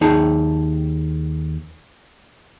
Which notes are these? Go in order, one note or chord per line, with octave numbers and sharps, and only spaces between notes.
D#2 D#4 G#4 A5